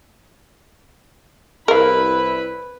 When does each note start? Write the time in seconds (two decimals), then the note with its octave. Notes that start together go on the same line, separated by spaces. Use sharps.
1.68 C2 E4 A#4 B4 F5 B5